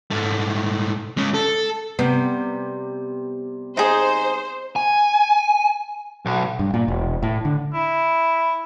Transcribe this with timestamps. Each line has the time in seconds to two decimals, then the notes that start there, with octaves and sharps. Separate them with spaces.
0.11 G#2 A3
1.17 G#3 C#4
1.35 A4
1.99 C3 G3 B3
3.77 D#4 G#4 C5
4.76 G#5
6.26 B1
6.59 G2
6.74 A#2
6.88 E1
7.23 A2
7.45 D3
7.74 E4